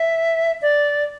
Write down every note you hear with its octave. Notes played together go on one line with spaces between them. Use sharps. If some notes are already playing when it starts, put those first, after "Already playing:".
Already playing: E5
D5